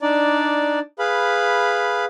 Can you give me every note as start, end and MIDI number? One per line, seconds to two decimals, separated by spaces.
0.02 0.79 62
0.02 0.79 63
0.02 0.79 74
0.99 2.05 68
0.99 2.05 71
0.99 2.05 77
0.99 2.05 83